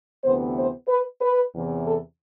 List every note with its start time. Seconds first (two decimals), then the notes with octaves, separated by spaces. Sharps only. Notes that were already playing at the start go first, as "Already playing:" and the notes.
0.24 D2 C3 E3 B3 C5
0.57 C5
0.88 B4
1.21 B4
1.53 E2 C3 E3
1.85 A4